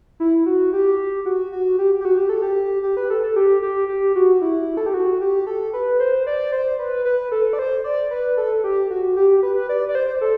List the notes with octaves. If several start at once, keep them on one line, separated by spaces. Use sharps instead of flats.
E4
F#4
G4
F#4
F#4
G4
G4
F#4
G4
A4
G4
G4
B4
A4
A4
G4
G4
G4
F#4
E4
A4
G4
F#4
G4
A4
B4
C5
D5
C5
B4
B4
A4
D5
C5
D5
B4
A4
G4
F#4
G4
B4
D5
D5
C5
A4